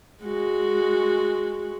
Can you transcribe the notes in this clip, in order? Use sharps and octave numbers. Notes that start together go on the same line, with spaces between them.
G#3 F#4